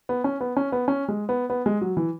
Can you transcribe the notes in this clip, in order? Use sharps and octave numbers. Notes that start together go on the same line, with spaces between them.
B3
C#4
B3
C#4
B3
C#4
G#3
B3
B3
G#3
F#3
E3